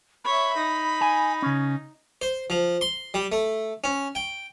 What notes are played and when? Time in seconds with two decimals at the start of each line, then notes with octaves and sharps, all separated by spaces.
0.24 C#5 E5 B5
0.56 D#4
1.01 G#5
1.42 C#3 C#4
2.22 C5
2.50 F3
2.81 C6
3.14 G3
3.32 A3
3.84 C#4
4.15 G5